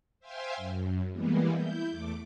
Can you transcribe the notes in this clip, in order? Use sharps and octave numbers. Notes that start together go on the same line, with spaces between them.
C5 E5 F5 G5 G#5 C6
F#2
E3 G3 G#3 A#3 B3
E4 G6
E2 A3 D6